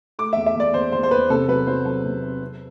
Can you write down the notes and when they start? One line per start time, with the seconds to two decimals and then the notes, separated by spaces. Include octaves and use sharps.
0.19 A3 D6
0.33 E2 E5
0.46 E5
0.55 E2 D5
0.74 E2 C5
0.92 E2 C5
1.03 C5
1.11 E2 B4
1.30 C3 A4
1.48 F#3 B4
1.67 F#3 C5
1.85 F#3 A4
2.05 C3
2.23 C4
2.41 C4